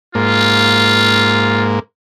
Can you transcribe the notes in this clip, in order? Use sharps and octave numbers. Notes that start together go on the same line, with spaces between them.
G#2 A#3 F4